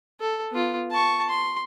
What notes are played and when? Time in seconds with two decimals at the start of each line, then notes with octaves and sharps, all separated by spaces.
0.21 A4
0.51 B3 F4
0.91 A5 C#6
1.29 C6